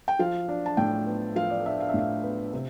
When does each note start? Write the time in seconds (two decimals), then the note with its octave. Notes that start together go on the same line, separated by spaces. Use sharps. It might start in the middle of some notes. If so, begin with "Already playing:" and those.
0.08 G5
0.19 F3 F5
0.49 D4
0.66 A5
0.77 A2 G5
1.06 B3
1.36 F3 F5
1.50 D5
1.66 D4 E5
1.80 F5
1.89 E5
1.94 A2 F5
2.23 B3
2.53 C3